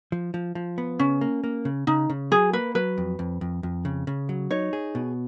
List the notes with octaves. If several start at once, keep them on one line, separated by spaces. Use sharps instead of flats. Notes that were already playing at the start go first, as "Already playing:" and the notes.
F3
F3
F3
B3
C#3 C#4
A#3
A#3
C#3
C#3 D#4
C#3
F#3 G#4
A#3 B4
F#3 B4
F2
F2
F2
F2
C#3
C#3
F#3
D#4 C#5
G#4
B2